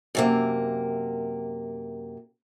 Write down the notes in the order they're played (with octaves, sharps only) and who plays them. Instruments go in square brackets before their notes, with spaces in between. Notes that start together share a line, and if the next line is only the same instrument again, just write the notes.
[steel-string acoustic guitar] F#2 C3 A#3